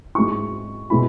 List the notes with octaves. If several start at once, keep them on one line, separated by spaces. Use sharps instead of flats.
G#2 G#3 E4 C#6
B2 G#3 E4 B5